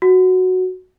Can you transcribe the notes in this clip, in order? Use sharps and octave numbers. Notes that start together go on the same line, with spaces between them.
F#4